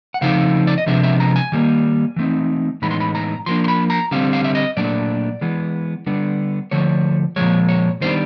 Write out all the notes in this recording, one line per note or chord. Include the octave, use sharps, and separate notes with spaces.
F#5
C#3 F3 A3 C4 D#4 F5
D5
D#5
C3 F3 G#3 B3 D4 E5
E5
A#5
G#5
D#3 G3 A#3
E3 A3 C4 D#4
A2 E3 G#3 B3 D#4 B5
C6
B5
A#5
F3 A#3 D4 C6
C6
B5
A#5
D3 G3 C4 F5
F5
E5
D#5
A#2 F#3 A3 D4 D5
E3 G#3 B3
D3 G3 B3 D4
D3 F3 A3 C#5
A#2 F3 G#3 C#5
C#5
D#3 G3 B3 D4 C5